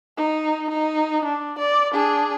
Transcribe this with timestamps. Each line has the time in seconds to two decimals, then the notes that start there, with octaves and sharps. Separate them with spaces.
0.17 D#4
0.70 D#4
1.25 D4
1.59 D5
1.93 D4 G#4